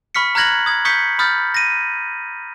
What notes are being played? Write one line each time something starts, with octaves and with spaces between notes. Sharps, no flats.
B5 C#6 F6 B6 C#7
A#5 F6 F#6 G#6 A#6 F#7
D#6 G#6
C#6 D#6 G6 B6 C#7
B5 D#6 F6 G6 A6
A#6 D#7